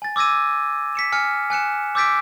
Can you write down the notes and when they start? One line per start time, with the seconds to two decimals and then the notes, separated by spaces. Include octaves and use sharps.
0.02 G#5 A6
0.16 D6 E6 G#6 A#6 D#7
0.95 B6 C#7 E7
1.12 G#5 F6 C#7
1.50 G#5 F#6 C#7 E7
1.95 D6 E6 G6 A6 B6 D7